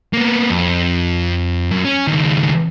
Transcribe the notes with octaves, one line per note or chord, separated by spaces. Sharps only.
A#3 B3
F2
F#2
C#4
C#2 D#3